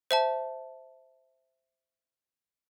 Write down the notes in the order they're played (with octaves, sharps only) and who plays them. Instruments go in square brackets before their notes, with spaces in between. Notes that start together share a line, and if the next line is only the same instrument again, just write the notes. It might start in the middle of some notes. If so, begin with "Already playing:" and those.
[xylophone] C5 E5 A5